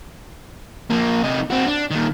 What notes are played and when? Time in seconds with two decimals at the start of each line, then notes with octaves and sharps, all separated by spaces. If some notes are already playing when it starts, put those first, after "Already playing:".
0.91 F3 A#3
1.23 C3 D#4
1.51 C4 F#4
1.67 D4
1.91 A#2 D#3